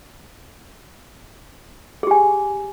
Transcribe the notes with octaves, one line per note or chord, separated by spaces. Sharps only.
G4 G#4 G#5